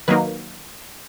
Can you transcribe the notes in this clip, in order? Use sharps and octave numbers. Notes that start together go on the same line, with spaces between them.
D#3 F#3 A#3 D#4 B4